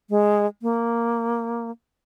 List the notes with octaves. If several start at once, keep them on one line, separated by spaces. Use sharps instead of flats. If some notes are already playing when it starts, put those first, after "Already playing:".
G#3
A#3